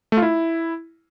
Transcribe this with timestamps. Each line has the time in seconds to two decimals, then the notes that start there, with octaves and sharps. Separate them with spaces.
0.12 A3
0.17 F4
0.22 E4